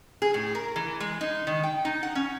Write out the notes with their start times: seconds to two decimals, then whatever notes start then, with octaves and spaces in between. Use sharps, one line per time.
0.22 G#4
0.34 A2
0.55 A#4
0.76 E3
1.00 G#3
1.21 D#4
1.47 D#3
1.63 G5
1.85 D#4
2.03 F#5
2.15 C#4